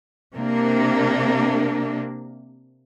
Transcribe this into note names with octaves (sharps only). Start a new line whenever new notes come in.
C3 A#3 D4